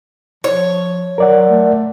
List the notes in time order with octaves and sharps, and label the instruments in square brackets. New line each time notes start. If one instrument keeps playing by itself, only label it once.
[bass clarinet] F3 [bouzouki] C#5
[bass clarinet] F#3 [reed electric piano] A#4 D5 F#5
[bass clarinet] A3